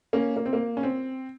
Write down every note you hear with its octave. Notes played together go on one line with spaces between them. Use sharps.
A#3 C#4
A#3
C4
A#3
C#4
C4